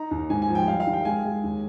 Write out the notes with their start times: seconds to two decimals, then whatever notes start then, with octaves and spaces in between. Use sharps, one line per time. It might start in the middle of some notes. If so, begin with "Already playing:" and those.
Already playing: D#4 A#5
0.11 D#2
0.30 G#2 G#5
0.42 G#5
0.49 F3
0.55 G5
0.68 G3 F5
0.80 F5
0.87 D#3
0.93 G5
1.05 G#3 G#5
1.24 G#3
1.43 D#2